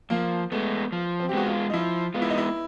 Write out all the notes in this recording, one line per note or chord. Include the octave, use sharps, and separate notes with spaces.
F3 A#3
G#3 A3 B3
F3
C4
G4
G#3 B3 F#4
F4
D#4
F3 E4
G#3 B3 F4
E4
D#4
E4